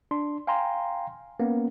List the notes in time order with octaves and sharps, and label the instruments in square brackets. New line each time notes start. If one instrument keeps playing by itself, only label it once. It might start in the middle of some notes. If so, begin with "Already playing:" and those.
[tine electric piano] D4 C6
F5 G5 G#5 A#5 C6
A#3 B3 C#4